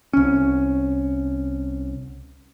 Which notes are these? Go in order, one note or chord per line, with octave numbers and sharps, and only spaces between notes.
C2 C#4